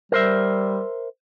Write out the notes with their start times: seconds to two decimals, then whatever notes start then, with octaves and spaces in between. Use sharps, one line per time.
0.12 G3 A#4 C5 E5